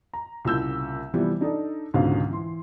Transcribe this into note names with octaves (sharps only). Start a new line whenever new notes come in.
A#5
C2 A#2 C#3 E6 G6
C3 E3 F3 G3 B3
D4 D#4 A4 D5
C#2 G#2 B2 D3 C#4 F5
E3 C6